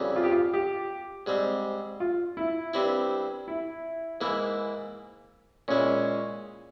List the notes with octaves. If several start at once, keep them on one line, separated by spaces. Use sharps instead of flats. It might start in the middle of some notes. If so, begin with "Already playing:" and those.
Already playing: F2 C#3 E3 G3
F4
G4
F4
G4
G#2 G3 C4
F4
E4
G2 G3 C4 E4
E4
G#2 E3 A#3 E4
A#2 G#3 C#4 E4